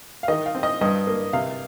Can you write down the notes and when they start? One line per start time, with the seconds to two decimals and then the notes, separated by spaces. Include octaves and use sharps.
0.23 F5
0.28 D#3 D#5
0.46 F5
0.55 C4
0.63 D#5
0.81 G2 D#5
1.07 A#3
1.33 C3 F5